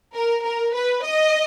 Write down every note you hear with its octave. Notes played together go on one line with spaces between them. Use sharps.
A#4
A#4
B4
D#5